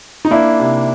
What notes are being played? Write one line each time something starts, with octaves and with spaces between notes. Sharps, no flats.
D#4
A#3 D4 E4
C3